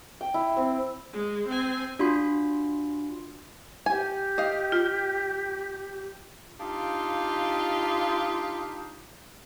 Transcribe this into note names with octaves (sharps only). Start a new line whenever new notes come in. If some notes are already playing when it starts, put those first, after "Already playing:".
G5
E4
C4
G#3
C4 G#5
D4 F4 F#4 C6
G4 G#5
D#5 F5
F4
D4 D#4 F4 G4 F5